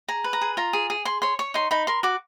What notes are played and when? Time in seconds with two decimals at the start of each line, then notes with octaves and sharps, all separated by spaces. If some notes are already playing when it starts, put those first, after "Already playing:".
0.08 G#4 A#5
0.24 B4
0.33 A#5
0.41 G#4
0.57 F4 A#5
0.73 G#4
0.90 G#4
1.05 G#4 C6
1.22 C#5 C6
1.39 C#5 C#6
1.54 D#4 C6
1.71 D#4 B5
1.87 A#4 C6
2.03 F#4 D6